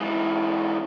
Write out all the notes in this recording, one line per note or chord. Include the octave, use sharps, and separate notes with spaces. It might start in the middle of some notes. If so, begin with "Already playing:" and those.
G#2 E3